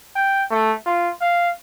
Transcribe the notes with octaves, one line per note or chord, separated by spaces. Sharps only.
G5
A3
F4
F5